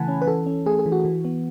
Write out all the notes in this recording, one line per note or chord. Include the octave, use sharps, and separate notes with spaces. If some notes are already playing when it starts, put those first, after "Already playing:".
Already playing: C#3 E3 A3 F#5 G#5 A5 B5
C#4
B4
E3 A4
C#4
A3 G#4
G#4
E3
F#4
E3
B3